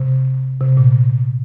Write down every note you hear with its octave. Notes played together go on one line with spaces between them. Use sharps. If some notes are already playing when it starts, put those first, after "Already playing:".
Already playing: C3
C3
A#2